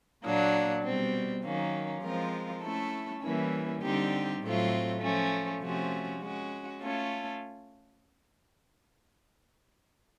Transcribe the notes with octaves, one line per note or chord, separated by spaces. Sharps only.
A#2 F#3 A#3 D4
B2 G3 C4
D#3 F#3 A#3 C#4
F3 G#3 C4 F4 A#4
A3 C#4 E4 A4
E3 G3 A#3 C#4 E4
D3 G3 C4 D#4 G4
A2 F#3 A3 C4 F4
F3 A3 C#4
C3 F3 A3 C#4 F#4
G#3 C#4 F#4
A3 C#4 F4 A4